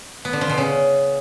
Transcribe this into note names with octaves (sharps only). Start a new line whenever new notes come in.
B3
D3
F3
B2
C#3